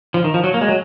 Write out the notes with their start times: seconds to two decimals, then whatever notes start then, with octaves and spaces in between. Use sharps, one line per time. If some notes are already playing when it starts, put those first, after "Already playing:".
0.14 F3
0.24 D#3
0.34 F3
0.44 F#3
0.54 A#3
0.61 G#3
0.69 F#3